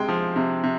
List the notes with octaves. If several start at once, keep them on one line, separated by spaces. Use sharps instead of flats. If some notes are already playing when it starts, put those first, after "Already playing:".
Already playing: C3 G#3 G5
F3
C3
C3